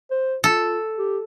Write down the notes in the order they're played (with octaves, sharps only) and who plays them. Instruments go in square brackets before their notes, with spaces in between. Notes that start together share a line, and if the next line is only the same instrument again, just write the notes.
[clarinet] C5
[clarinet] F4 [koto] A4
[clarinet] G4